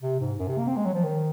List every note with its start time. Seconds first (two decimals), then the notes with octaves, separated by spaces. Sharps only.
0.02 C3
0.20 G#2
0.39 F#2
0.48 C3
0.58 A#3
0.67 C4
0.77 G#3
0.85 F#3
0.94 F3
1.04 D#3